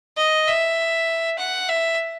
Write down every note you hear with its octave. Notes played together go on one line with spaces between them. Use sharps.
D#5
E5
F#5
E5